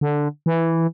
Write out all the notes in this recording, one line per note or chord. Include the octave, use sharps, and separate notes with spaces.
D3
E3